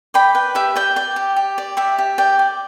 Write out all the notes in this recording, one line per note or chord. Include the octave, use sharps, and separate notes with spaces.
D5 G5 B5
B4 G5
G4 E5
D5 G5
D5 G5
G4
G4
D5
G4 E5
G4
D5 G5
D5